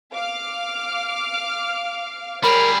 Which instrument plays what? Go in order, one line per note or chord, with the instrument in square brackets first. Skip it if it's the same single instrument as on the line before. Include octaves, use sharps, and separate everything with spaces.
[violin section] F5 D6 F6
[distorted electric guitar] G3 G#4 [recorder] A#4 [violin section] C#5 [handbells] B5